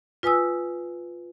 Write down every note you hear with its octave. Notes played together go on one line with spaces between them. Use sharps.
F4 B4 G#5 D#6 E6